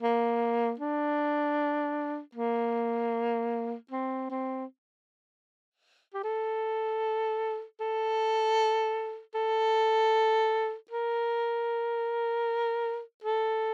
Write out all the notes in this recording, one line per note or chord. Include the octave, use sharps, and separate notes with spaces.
A#3
D4
A#3
C4
C4
G4
A4
A4
A4
A#4
A4